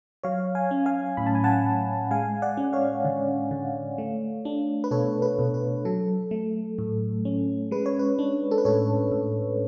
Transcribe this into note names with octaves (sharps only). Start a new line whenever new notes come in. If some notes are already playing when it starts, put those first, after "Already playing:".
F#3 C#5 F5
F5 G#5
C#4
F5 G#5
A2 B5
A5
G#5
F#5 A5
A2
G#3 F5 G#5
D5 F#5
C#4
C#5 F5
D3
D3
A3
D4
B4
B2 A4 C#5
B4
B2
B4
F#3 A4
A3
A2
C#4
G#3 B4
C#5
B4
D4
A4
B4
A2 A4 C#5
A2